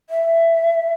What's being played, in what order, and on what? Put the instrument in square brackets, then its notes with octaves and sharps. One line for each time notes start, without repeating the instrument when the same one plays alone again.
[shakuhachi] E5